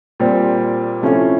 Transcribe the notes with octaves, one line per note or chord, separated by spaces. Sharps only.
A#2 G3 C4
C3 F3 A3 C#4 E4